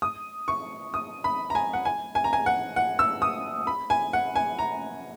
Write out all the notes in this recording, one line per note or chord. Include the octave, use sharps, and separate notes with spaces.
D#6
C#6
D#6
B5
A#5
G#5
F#5
G#5
G#5
A#5
G#5
F#5
F#5
E6
D#6
B5
G#5
F#5
G#5
A#5